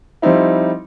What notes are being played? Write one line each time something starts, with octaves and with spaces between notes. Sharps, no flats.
F3 G3 C4 D#4 E4